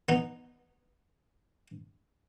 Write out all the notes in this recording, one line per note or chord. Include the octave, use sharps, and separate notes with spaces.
B3 D#4